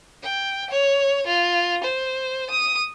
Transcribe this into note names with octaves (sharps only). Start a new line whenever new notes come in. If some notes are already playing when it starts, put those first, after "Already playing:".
G5
C#5
F4
C5
D#6